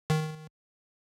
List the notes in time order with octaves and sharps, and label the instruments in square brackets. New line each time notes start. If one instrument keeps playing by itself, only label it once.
[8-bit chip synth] D#3